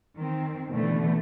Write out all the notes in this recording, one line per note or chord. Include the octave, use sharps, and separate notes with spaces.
D#3 C4
B2 D3 E3 A3